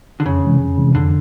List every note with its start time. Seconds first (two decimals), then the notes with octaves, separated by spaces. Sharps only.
0.20 D3
0.25 F2 C#3
0.43 C3 E3 G#3
0.60 F2
0.78 C3 E3 G#3
0.95 F2 D3